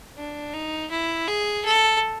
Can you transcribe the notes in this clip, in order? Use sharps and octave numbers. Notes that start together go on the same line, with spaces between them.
D4
D#4
E4
G#4
A4